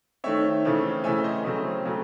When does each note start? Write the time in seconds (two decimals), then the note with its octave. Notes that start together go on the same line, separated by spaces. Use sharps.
0.24 D#3 A3 C4 C#5 E5
0.65 C#3 E3 A3 C4
1.04 C#3 E3 A3 C4 E5 G#5
1.24 C5 D#5
1.44 C#3 F#3 A3 C4
1.85 C#3 F#3 A3 C4